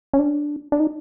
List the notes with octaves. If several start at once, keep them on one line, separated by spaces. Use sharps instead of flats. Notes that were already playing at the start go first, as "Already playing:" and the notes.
C#4
D4
D4
D#4